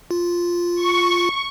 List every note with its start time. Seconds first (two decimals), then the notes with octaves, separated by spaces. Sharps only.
0.11 F4
0.81 C#6